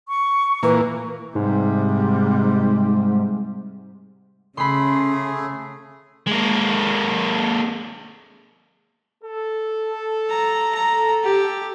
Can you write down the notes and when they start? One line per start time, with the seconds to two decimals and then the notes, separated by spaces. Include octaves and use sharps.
0.09 C#6
0.63 A#2 E3 A#3 B4
1.35 G#2 C3 G3
4.57 C#3 A3 G#4 B5 C6
6.27 G#3 A#3
9.24 A4
10.30 A#5
10.75 A#5
11.24 G4